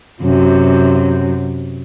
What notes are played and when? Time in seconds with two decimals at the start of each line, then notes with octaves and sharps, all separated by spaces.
0.23 F#2 C3